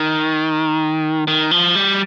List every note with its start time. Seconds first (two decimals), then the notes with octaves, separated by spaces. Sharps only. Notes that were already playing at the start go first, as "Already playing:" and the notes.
Already playing: D#3
1.28 D#3
1.51 F3
1.76 G3